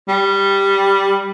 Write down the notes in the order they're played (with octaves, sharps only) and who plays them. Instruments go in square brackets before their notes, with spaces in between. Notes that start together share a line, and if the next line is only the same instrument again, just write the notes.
[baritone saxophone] G3